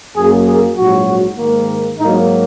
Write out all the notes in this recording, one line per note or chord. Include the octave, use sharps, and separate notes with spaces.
F#2 F#3 A#3 G#4
G#4
A#1 G#2 F#3 F#4
G#2 D#3 A#3
G#2 F#3 A#3 D#4